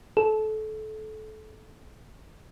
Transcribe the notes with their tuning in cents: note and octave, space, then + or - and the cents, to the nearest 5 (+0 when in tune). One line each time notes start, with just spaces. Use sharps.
A4 -25